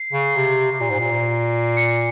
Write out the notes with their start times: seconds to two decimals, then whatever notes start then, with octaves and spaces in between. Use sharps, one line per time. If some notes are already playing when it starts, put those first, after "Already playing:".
Already playing: C7
0.13 C#3
0.36 C3
0.72 C3
0.81 A#2
0.90 G#2
1.00 A#2
1.77 C#7